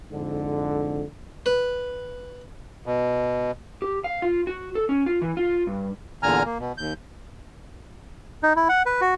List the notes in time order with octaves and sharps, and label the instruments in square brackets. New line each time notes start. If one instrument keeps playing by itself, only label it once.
[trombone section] F2 G#2 D3
[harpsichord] B4
[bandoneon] B2
[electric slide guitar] G4
F5
F4
F#4
A4
C#4
F4
E3
F4
G2
[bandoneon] E2 A#2 D3 G#5 A#5 F6
A#3
B2
D#2 G6
[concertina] D#4
E4
F#5
B4
F#4